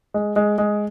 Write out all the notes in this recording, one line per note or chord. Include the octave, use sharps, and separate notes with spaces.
G#3
G#3
G#3